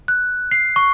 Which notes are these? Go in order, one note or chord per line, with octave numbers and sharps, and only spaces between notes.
F#6
C7
C#6